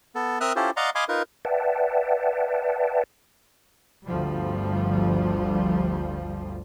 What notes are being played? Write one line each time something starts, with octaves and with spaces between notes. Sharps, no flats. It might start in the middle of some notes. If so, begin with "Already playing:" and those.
B3 A4
C4 A#4 E5 D#6 F6 F#6
C#4 E4 F4 G4 A4 C5
D5 D#5 F5 F#5 A#5 C6
D#5 F5 G#5 B5 C6 D6
D#4 F4 A#4 B4
B4 D5 E5 F#5 G5 A5
G1 D2 F3 G3